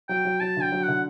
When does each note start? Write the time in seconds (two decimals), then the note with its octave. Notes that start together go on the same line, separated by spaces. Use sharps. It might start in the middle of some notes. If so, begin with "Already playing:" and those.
0.09 F#3 G5
0.25 F#3
0.40 F#3 A5
0.57 D3 G5
0.72 F#3
0.83 F#5
0.88 D3